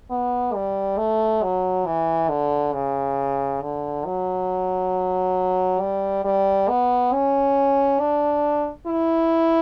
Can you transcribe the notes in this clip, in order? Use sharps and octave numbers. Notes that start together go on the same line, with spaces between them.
B3
G3
A3
F#3
E3
D3
C#3
D3
F#3
G3
G3
B3
C#4
D4
E4